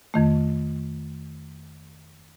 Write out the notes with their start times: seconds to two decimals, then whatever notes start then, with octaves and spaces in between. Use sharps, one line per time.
0.14 F2 D#3 A3